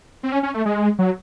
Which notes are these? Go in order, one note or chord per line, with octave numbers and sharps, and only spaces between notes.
C4
C#4
C#4
A3
G#3
F#3